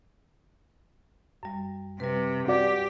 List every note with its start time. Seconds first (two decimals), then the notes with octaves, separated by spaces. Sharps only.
1.43 F#2 G3
2.00 C3 G3 B4
2.48 F#4 G4 D5